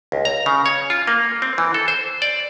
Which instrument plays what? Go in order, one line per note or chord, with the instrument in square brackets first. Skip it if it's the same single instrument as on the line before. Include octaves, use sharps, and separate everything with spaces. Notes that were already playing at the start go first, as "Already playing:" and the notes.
[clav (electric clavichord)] C#2
A#5
C#3
C#5
F4
A#3
C4
E3
A4
C5
D5